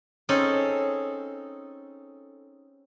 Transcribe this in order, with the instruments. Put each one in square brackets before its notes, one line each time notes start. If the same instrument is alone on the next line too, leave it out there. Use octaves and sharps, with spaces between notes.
[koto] C4 C#4 D#4 G#4 A4